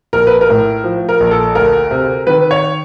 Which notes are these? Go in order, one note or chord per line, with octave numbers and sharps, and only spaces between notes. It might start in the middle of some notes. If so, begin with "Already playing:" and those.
A#1 A#4
B4
A#4
A2
F3
A#4
A#1
A4
D2 A#4
C3
D#3 B4
C#5